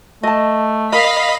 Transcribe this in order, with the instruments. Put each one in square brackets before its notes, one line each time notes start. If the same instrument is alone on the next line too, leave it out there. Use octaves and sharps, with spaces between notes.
[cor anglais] A3 [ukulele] D#5 A5
[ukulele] A#4 [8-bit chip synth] D#5 B5 [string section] F5 B6